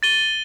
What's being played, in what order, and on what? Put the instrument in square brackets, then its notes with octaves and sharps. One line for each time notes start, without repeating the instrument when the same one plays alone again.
[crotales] A6 D#7 G7